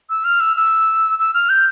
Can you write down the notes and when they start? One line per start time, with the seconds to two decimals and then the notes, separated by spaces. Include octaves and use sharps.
0.10 E6
0.24 F6
0.40 E6
0.56 E6
1.19 E6
1.34 F6
1.49 G6